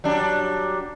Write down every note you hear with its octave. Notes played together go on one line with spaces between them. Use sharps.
F#3 G3 D4